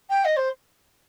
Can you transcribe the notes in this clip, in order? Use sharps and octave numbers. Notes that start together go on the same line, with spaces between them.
G5
D#5
C5